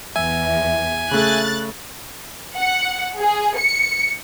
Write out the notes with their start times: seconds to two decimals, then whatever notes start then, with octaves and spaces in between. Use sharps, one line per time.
0.16 E2 E5 G#5
1.11 C#3 A3 F#6 A6
2.57 F#5
3.19 G#4
3.57 C#7